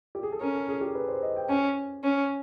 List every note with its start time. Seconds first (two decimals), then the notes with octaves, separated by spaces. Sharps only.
0.15 G4
0.23 G#4
0.32 A4
0.40 C#4 A#4
0.55 A4
0.68 G#4
0.81 G4
0.95 B4
1.08 C5
1.22 D#5
1.36 G5
1.49 C#4 G#5
2.04 C#4